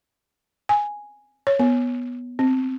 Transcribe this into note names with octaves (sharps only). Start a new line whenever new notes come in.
G#5
C#5
B3
C4